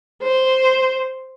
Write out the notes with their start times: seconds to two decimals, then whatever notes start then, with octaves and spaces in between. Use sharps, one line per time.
0.22 C5